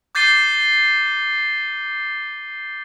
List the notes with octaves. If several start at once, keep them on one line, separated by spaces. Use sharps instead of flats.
D6 G6 A6 C7 D#7 G7